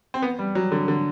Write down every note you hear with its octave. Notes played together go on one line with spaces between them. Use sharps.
C4
B3
G3
F#3
D3
D3